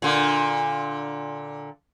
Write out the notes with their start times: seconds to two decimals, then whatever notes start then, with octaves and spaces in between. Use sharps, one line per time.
0.02 A#2 D3